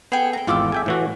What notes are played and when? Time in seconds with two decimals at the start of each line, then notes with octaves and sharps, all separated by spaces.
0.12 B3 G#4 A4 G5
0.33 G5 A#5
0.47 G#1 E2 A3 F4 D6 E6
0.72 E5 G5 G#5
0.86 A2 E3 F#4